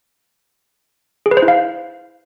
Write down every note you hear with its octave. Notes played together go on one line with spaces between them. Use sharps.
G#4
B4
C5
E4
F5